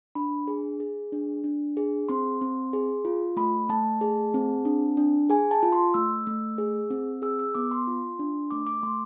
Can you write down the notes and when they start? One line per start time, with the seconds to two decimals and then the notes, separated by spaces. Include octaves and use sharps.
0.15 D4 B5
0.48 G#4
0.80 G#4
1.12 D4
1.44 D4
1.77 G#4
2.09 C4 C6
2.41 C4
2.73 G#4
3.05 F4
3.37 A3 B5
3.69 A3 A5
4.01 G#4
4.34 C4
4.65 D4
4.97 D4
5.30 G#4 G#5
5.51 A5
5.63 F4
5.72 C6
5.94 A3 E6
6.27 A3
6.58 G#4
6.90 C4
7.22 G#4 E6
7.39 E6
7.55 B3 D6
7.71 C6
7.87 F4
8.19 D4
8.51 A3 D6
8.67 D6
8.83 A3 C6